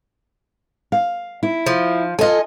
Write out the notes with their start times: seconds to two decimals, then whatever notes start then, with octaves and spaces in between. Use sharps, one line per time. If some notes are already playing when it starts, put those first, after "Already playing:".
0.92 F5
1.43 E4
1.66 F3
2.19 F4 A4 D#5 G#5